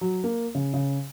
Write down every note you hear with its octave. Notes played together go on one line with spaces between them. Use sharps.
F#3
A#3
C#3
C#3